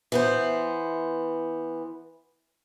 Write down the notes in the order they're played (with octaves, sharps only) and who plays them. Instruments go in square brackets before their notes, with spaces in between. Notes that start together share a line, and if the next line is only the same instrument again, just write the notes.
[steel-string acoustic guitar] E3 B3 C5